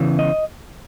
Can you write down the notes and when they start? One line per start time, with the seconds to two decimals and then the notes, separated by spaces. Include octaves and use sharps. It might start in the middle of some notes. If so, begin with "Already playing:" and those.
Already playing: E2 C#3 E3
0.19 D#5